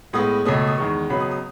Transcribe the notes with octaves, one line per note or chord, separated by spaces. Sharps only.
A2 G#3 B3 D#6
C#2 B2 A3 C#4 D#6
D#6
E2 D#3 G#3 C#6
C#2 C#3 F#3 B3 B5
D#6
D#6